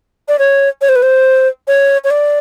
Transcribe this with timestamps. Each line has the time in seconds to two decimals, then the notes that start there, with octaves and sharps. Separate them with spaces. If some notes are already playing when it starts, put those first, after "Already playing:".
0.28 D5
0.39 C#5
0.81 C#5
0.89 C5
0.96 B4
1.02 C5
1.67 C#5
2.04 C#5
2.10 D5